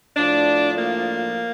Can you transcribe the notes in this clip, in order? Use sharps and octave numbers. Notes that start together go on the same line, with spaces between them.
A2 F3 D4
A#3